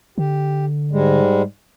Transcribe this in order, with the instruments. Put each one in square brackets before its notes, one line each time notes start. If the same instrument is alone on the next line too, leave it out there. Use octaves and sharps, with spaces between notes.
[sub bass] D3 [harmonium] G4
[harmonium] G#2 G3 G#3